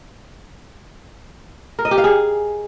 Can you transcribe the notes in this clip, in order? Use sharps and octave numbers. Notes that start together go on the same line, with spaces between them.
A#4
D#5
G4
F5
G#4